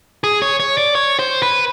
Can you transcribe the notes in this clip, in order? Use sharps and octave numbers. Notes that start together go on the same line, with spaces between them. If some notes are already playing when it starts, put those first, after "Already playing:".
G#4
C#5
C#5
D5
C#5
C5
B4